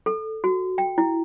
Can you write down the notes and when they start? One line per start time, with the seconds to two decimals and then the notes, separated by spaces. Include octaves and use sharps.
0.06 A4
0.44 F#4
0.78 G5
0.98 E4